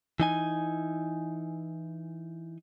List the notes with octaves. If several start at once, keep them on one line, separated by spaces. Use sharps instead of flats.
E3 D#4 G#5